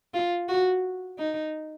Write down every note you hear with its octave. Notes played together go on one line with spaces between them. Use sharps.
F4
F#4
D#4